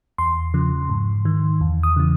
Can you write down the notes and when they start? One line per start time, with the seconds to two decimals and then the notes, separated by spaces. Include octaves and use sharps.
0.18 E2 C6
0.54 C#3 F3
0.90 G#2
1.25 D#3
1.61 E2
1.83 D#6
1.97 C#3 E3